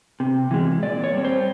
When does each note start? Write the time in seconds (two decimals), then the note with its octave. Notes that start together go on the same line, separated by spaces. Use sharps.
0.20 C3
0.51 E3 G#3
0.83 A#2 D5
1.04 C#5
1.13 G3 C4
1.24 C5